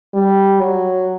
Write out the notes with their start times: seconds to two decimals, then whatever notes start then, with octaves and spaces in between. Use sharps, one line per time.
0.14 G3
0.60 F#3